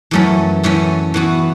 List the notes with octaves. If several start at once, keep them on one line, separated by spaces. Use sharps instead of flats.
F#2 E3 A3 C#4
F#2 E3 A3 C#4
E3 B3 F#4